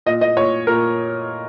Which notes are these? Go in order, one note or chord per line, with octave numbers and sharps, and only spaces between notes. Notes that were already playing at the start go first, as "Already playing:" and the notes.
A#2 D#5
D#5
A#2 C#5
A#2 A#4